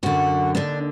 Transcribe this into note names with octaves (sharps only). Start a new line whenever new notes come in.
F#2 D3 F#4
D#2 D3 D4